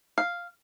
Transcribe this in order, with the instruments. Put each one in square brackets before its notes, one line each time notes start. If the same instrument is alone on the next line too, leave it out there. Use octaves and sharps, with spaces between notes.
[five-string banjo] F5